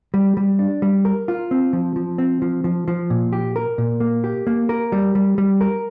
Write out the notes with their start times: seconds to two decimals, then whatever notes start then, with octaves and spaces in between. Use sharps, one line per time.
0.14 G3
0.37 G3
0.59 D4
0.82 G3
1.05 A#4
1.28 F4
1.51 C4
1.73 F3
1.96 F3
2.18 C4
2.42 F3
2.64 F3
2.88 F3
3.10 A#2
3.33 G4
3.56 A#4
3.78 A#2
4.00 A#3
4.24 G4
4.47 A#3
4.69 A#4
4.92 G3
5.15 G3
5.38 G3
5.61 A#4